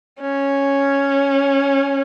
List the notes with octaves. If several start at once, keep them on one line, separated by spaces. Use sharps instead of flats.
C#4